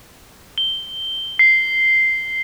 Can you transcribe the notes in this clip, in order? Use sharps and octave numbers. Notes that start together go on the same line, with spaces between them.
G7
C7